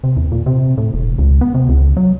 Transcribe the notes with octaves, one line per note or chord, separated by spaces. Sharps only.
C3
E2
A#2
C3
A2
E1
C#2
B3
C3
C#2
F#3